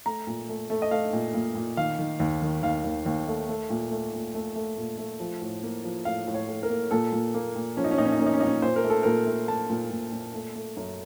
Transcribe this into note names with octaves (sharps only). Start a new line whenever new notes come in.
A3 A#5
A#2
A3
A3
D#5
A3 F5
A#2
A#2
A#2
D#3 F5
D#3
D#2
D#3
D#2 F5
D#2
D#2
A3
A3
A#2
A3
A#2
A3
A3
A#2
A3
F3
A2
A#3
F3
A2 F5
A2
C#5
A2
A#4
A#3
A#2 A4
A#2
A#3
A#2
F3 C#4
D#4
C#4
A#2 D#4
C#4
D#4
A#3 C#4
D#4
C#4
A#2 D#4
C#4
A#2 C5
A#4
A3
A4
A#2 A#4
A3
A3 A5
A#2
A#2
A#2
A3
A3
F#2